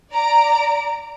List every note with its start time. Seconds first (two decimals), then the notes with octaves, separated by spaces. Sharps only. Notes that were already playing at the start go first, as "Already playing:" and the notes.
0.11 D5 A#5 D7